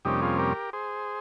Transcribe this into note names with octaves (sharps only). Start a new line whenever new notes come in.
F2 C3 G3 A#3 C#4 D#4 G4
F4 G#4
G4 A#4
G#4 C5